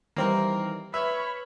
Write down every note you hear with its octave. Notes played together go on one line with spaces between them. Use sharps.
D#3 E3 G3 A#3 C4 A#4
B4 C#5 E5 B5 F6 G#6